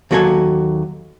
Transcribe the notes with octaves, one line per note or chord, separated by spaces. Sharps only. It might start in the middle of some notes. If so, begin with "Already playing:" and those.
D#2 F#3 F#4 A4 B4 G#5